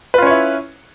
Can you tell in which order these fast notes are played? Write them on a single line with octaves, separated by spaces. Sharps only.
B4 F4 C#4 C#5 E4